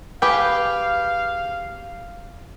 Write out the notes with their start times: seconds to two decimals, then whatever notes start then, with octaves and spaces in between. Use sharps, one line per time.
0.22 G4 G#4 B4 F5 D6 G6